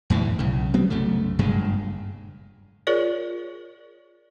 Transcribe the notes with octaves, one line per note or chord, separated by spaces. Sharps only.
E2 A2 D#3 E3
B1 C#3
F#3 B3 C4
C2 F#2 C#3 A3
F#1 G2 A#2 G#3
F4 G#4 A#4 C#5 D5